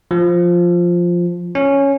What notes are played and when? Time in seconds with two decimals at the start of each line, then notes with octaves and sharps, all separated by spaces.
0.11 F3
1.55 C#4